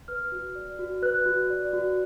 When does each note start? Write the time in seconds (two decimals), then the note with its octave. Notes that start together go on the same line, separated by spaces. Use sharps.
0.08 B4 F6
0.32 F#4
0.55 D5
0.79 F#4
1.02 B4 F#6
1.26 F#4
1.50 D5
1.73 F#4